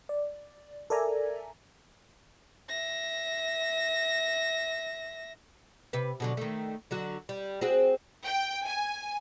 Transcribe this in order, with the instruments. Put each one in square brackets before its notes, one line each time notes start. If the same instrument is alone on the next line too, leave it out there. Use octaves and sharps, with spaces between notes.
[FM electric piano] D5
A4 A#4 D5 E5 G#5 A#5
[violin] E5 A#6
[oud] C3 B4
B2 D3 F#3
D#3 A3
D3 F#3 F#4
G3
C4 F#4 G#4
[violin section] G5
G#5